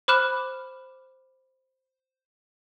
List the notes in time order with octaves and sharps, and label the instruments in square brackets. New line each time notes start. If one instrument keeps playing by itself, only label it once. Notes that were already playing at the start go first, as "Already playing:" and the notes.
[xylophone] C5 B5 D6 F6 F#6 E7